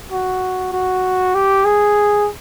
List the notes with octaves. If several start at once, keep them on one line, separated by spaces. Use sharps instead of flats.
F#4
F#4
G4
G#4